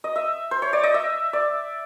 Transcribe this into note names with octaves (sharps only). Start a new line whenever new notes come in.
D#5
E5
C5
C#5
D5
D#5
E5
D5